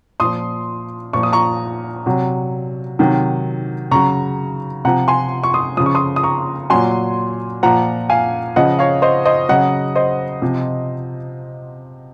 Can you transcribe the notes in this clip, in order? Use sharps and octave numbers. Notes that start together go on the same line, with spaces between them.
A#2 F3 C6 D#6
A#2 F3 C#6
D#6
A#5 C#6
C3 F#3
C3 D#3 F#3
C#3 F#3 A#5 C#6
C3 F3 F#5 A#5
G#5 C6
C#6
C6 D#6
C#3 F3 D#6
C#6
C6 D#6
D#6
A#5 C#6
A#2 F#3 G#5 C6
A#2 F3 F#5 A#5
F5 G#5
C#3 F3 D#5 F#5
C#5 F5
C5 D#5
C5 D#5
C#3 F#3 D#5 F#5
C5 D#5
C3 F3